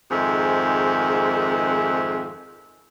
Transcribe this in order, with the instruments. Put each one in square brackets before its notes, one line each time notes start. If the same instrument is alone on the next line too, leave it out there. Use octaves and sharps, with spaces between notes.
[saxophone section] F2 G#2 D#3 G#4 E5